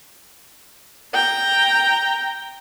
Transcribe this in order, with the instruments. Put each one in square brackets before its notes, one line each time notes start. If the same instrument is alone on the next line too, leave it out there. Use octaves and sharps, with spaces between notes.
[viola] G5 A#5